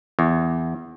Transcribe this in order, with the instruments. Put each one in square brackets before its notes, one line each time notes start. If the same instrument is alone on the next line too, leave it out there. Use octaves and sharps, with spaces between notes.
[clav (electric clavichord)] E2